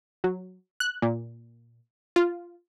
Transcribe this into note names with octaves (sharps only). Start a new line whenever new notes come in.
F#3
F#6
A#2
F4